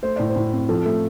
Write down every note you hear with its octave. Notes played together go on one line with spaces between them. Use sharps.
A3 C5
A2 D5
C5
A2
C4
F3 A4
A3